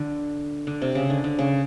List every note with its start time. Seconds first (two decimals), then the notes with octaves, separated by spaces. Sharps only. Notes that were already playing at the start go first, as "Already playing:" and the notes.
Already playing: D3
0.67 D3
0.82 C3
0.95 C#3
1.10 D3
1.24 D3
1.39 C#3